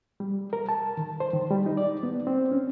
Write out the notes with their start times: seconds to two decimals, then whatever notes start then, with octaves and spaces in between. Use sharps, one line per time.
0.20 G3
0.53 A#4
0.69 A5
0.97 D#3
1.20 C5
1.34 D#3
1.51 G3
1.66 D#4
1.77 D5
2.03 B3
2.27 C4
2.52 C#4